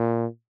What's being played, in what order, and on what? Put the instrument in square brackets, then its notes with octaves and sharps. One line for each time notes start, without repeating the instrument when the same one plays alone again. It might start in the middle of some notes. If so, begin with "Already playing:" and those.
Already playing: [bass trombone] A#2